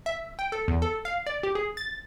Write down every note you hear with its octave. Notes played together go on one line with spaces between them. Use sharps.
E5
G5
A4
E2
A4
F5
D5
G4
G#4
A6